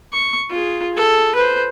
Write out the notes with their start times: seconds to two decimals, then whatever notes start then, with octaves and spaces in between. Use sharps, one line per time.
0.13 C#6
0.50 F4 G#4
0.93 G#4 A4
1.35 B4 C5